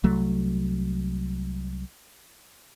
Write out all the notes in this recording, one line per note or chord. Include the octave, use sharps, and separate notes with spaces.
C2 F#3 A3